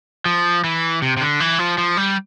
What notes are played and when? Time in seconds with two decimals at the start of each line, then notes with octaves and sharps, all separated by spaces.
0.26 F3
0.64 E3
1.02 C3
1.17 C3
1.21 D3
1.40 E3
1.59 F3
1.78 F3
1.97 G3